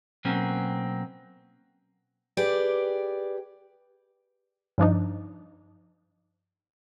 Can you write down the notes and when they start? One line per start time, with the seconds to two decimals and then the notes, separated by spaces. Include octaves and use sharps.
0.25 B2 F#3 A#3 C4 C#4
2.37 G4 G#4 B4 D5
4.78 G2 F3 D4 D#4